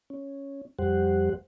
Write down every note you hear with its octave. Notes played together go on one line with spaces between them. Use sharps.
C#4
F2 G3 G4 C5 F#5